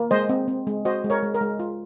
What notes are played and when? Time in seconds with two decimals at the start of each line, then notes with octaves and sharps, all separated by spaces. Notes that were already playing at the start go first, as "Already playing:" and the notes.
Already playing: A#3
0.11 G#3 C5 D#5
0.29 C4
0.48 C4
0.67 G#3
0.85 F#4 C5 D#5
1.04 G#3
1.10 A#4 C#5
1.23 G#3
1.34 A#4
1.41 G#3
1.59 F4